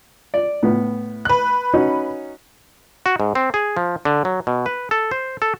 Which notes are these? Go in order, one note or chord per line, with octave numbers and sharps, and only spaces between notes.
D5
A2 B3
B4 F#6
C#4 D#4 F#4
F#4
G#2
C4
G#4
F3
D3
F#3
B2
B4
A4
C5
A4